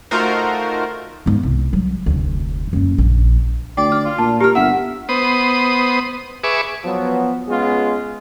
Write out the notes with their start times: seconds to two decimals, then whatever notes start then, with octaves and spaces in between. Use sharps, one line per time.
0.11 A3 D#4 F4 F#4 A#4 C5
1.26 G#2 B3
1.43 C2
1.73 F#3 G3
2.06 F1 D2
2.73 F#2 A#3
2.98 A#1
3.77 D2 D5 G5
3.92 F6
4.05 F4
4.18 A#2 A5
4.41 G4 A#4 F6
4.55 G1 E5 F#5
5.09 B3 C5 D#6
6.44 G#4 B4 E5 C#6 D6
6.84 F3 F#3 B3
7.48 G#3 B3 C#4 F4 G#4